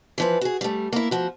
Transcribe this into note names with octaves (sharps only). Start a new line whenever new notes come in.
E3 F3 B4
F#4 G#4
G3 A3
A#3 E4
F3 F#4